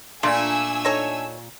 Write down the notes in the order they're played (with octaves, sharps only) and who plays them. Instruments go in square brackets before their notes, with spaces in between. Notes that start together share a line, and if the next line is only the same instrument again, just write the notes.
[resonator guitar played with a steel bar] A#2 [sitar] A3 D4 [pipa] F4 [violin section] G#5 E6
[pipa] D#4 A4 C#5